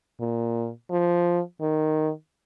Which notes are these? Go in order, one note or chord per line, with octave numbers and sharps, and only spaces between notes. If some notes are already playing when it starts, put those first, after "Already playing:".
A#2
F3
D#3